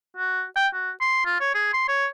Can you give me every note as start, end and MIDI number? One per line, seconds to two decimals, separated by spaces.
0.17 0.44 66
0.56 0.67 79
0.74 0.91 66
1.01 1.23 84
1.26 1.39 65
1.41 1.51 73
1.55 1.73 68
1.73 1.85 84
1.88 2.06 73